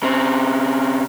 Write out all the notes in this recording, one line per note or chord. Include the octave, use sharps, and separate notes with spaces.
C#3 C4